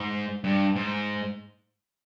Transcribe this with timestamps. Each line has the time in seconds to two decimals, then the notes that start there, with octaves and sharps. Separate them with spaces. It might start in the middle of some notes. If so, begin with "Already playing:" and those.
Already playing: G#2
0.44 G2
0.76 G#2